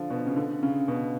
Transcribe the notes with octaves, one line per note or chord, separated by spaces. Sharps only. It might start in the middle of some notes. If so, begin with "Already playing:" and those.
Already playing: D3 F3
B2
C#3
D3
C#3
B2